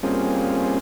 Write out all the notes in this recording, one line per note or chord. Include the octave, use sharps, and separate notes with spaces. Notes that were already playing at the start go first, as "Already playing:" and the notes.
G3 A#3 C4 C#4 F4 G#4